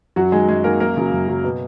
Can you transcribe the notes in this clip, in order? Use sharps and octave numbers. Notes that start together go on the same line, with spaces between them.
F#2 F#3 F#4
D#3 G#3 G#4
F#2 G#3 G#4
D#3 G#3 A#3 A#4
F#2 A#3 A#4
C#3 F#3
F#2
C#3 F#3
B2